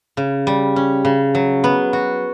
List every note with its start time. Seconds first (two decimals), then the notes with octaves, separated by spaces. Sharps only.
0.17 C#3
0.47 G3
0.76 C#4
1.05 C#3
1.35 F#3
1.64 B3
1.93 F#4